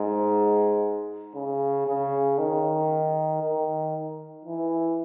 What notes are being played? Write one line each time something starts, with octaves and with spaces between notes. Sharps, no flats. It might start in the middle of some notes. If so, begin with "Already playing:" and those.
Already playing: G#2
C#3
C#3
D#3
D#3
E3